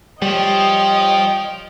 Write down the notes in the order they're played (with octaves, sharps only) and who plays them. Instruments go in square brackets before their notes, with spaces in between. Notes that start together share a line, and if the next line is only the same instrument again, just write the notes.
[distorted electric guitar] F3 [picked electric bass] G3 [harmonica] C#5 G5 [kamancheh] D#5